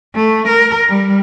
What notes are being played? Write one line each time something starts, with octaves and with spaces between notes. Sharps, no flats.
A3
A#4
G3